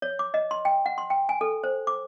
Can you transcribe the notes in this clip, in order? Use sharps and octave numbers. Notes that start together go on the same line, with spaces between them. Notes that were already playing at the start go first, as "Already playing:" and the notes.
C#5
D6
D#5
C6
G5
F#5
C6
G5
G#5
A4
C5
D6